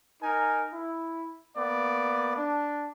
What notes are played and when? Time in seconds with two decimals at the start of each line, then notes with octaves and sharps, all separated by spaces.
0.23 D#4 A#4 G#5
0.73 E4
1.57 A#3 B3 D5
2.37 D4